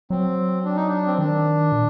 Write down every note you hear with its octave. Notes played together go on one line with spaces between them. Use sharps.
F#3 C4
D4
D#4
D4
C4
D#3 D4
A#2